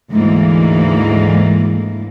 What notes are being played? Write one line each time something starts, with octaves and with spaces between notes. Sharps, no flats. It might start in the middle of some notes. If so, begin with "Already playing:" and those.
D2 G#2 E3 A#3